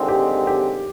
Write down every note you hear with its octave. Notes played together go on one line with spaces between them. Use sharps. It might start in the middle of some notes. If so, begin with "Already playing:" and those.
Already playing: D#2 D3 G#3 C4
G4
G4